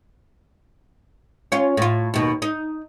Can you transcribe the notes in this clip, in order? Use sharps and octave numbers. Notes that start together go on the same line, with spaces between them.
C#4 F4
A2 F4
D#2 B2
D#4